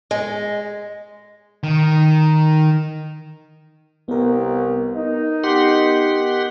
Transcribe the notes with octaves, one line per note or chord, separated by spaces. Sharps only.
G#3
D#3
C2 B3 A#4
D#4
G4 F#5 C6